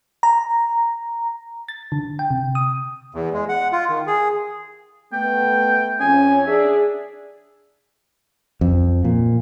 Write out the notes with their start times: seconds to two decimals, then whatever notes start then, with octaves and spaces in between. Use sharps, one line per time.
0.23 A#5
1.68 A6
1.92 D3
2.19 G5
2.31 C3
2.55 D#6
3.14 E2
3.33 G#3
3.49 F#5
3.72 F4
3.89 D#3
4.07 G#4
5.13 A3 B3 G5
6.00 F2 C#4 G#5
6.47 D4 G#4 E5
8.61 F2
9.04 A#2